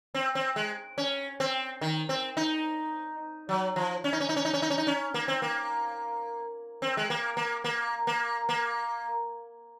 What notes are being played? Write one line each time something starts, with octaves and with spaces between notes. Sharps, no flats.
C4
C4
G#3
C#4
C4
D#3
C4
D#4
F#3
F3
C#4
D#4
C#4
D#4
C#4
D#4
C#4
D#4
C#4
D#4
C#4
A#3
C4
A#3
C4
G#3
A#3
A#3
A#3
A#3
A#3